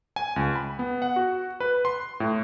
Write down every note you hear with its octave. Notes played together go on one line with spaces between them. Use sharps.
G#5
C#2
B5
B3
F#5
F#4
B4
C6
A2